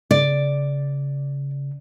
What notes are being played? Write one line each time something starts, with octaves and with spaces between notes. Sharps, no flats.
C#3 D5